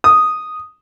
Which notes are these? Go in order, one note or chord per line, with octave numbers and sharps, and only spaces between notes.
D#6